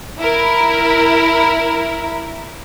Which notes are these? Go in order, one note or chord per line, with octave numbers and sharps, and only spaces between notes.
E4 A#4